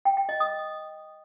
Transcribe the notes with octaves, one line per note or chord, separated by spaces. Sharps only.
G5
G5
D#5
D#6